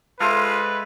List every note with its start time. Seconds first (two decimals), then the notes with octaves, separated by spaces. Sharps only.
0.20 G#3 F4 A4 B4 C5 E5